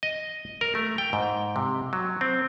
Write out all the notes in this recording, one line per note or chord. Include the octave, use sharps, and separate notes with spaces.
D#5
A#4
A3
G5
G#2
C3
F#3
C4